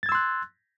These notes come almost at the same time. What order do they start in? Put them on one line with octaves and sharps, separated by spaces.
A6 G#6 E6 C6 F#6